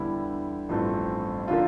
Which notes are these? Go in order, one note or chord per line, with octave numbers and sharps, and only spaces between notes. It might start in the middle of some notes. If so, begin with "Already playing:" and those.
Already playing: E2 D3 G3 E4
A1 G2 F3 A3 C4
D3 F3 A#3 F4